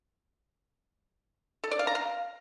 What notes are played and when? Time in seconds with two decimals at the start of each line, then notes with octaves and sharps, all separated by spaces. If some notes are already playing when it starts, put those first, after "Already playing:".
1.64 A4
1.71 D5
1.79 F5
1.87 A#5
1.95 F5